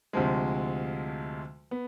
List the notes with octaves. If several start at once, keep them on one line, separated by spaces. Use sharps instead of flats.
D2 C3 F3 G#3
B3